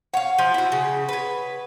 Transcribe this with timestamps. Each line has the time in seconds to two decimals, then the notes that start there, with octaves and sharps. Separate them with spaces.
0.14 C#5 F5 F#5
0.38 F3
0.54 E4 F#4
0.72 C#3
1.09 B4 C#5